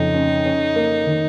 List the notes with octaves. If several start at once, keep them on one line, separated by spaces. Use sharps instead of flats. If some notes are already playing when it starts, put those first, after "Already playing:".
Already playing: F2 C#3 D#4
C#4
C#4
A#3
D#3